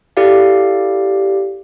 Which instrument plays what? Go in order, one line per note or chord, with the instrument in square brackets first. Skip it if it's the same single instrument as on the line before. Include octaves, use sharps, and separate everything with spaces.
[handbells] E4 G4 A4 D5 F5